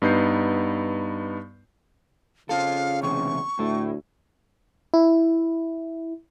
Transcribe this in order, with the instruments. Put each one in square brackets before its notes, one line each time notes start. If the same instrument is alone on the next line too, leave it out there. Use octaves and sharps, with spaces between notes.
[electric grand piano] G2 B3 D#4 G6 C7
[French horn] C#3 [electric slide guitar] F4 A4 [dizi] F5
[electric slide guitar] E2 C3 [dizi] C#6
[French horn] D2 [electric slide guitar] A2 A3
[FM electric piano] E4